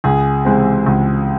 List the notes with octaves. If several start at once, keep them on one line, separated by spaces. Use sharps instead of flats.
C#2 G#4
C3 E3 G#3 C4
C#2